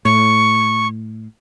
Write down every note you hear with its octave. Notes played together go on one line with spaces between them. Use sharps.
A2 C#6